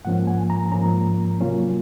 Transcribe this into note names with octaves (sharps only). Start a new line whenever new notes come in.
G#2 F3 A#3 C#4 F#5
G#5
A#5
G#2 F3 A#3 C#4 A#5
C3 F#3 A#3 C#4 F4